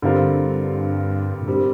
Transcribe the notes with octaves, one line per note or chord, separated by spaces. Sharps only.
G2 D3 G3 C4 F4 A#4
A#2
G2 G3 C4 G4 A#4